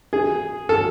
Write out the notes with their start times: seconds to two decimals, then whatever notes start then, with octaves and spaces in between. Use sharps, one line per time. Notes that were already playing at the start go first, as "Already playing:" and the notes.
0.13 G#4
0.69 A4